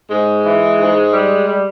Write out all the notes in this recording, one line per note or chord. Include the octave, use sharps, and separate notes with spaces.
G#2 G#3
E3
G#2
G3
G3